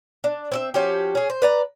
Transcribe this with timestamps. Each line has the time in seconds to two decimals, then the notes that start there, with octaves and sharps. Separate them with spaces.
0.24 D4
0.52 C4 D5 E5
0.74 F3 C#4 F#4 G4
1.15 C#4 G#4
1.30 C5
1.42 B4 D5 A#5